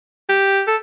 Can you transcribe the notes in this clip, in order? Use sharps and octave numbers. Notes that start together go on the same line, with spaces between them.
G4
A4